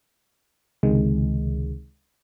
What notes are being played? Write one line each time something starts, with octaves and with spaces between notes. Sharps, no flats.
C#2 C3 D#3 G#3